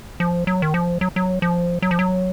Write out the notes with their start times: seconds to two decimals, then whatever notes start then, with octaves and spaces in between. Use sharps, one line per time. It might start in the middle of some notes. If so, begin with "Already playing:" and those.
0.20 F3
0.47 F#3
0.62 D#3
0.74 F3
1.01 F#3
1.16 F#3
1.42 F3
1.82 F#3
1.91 F3
1.99 F#3